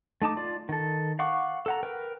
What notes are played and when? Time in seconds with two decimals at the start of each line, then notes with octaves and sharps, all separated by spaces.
0.22 A3 D#4 A5 D6
0.37 F4 D5
0.69 D#3 A4
1.19 F5 F#5 C#6 D6
1.66 A4 F#5 A#5
1.83 A#4 B4 G5